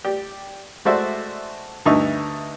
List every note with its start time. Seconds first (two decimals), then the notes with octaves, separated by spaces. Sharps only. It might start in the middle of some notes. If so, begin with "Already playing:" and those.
0.05 G4 D5
0.85 G#3 A3 F#4 C5 D5 E5
1.86 D2 G2 D#4 E5 C#6